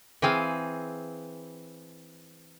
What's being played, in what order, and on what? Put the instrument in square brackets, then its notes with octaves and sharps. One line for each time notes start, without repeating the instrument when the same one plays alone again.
[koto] E3 C4 G#4 F5